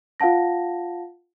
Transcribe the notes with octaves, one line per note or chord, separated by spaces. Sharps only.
F4 F5 F#5 A5 A#6